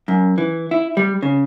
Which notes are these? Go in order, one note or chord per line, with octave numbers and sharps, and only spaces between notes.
F#2
E3
E4
G3
C#3